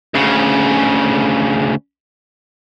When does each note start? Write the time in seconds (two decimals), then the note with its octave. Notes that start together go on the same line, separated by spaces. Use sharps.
0.15 D2 C#3